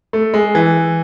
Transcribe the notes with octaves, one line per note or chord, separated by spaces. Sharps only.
A3
G#3
E3